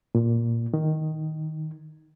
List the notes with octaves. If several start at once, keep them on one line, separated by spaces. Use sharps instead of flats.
A#2
D#3